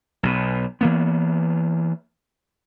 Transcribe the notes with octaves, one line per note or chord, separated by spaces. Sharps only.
B1 B2
E3 A#3 B3